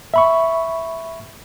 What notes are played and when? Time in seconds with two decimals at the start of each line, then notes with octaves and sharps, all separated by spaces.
0.14 E5 B5 C#6